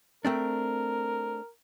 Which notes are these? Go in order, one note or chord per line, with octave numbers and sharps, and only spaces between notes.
A3 C4 D4 A#4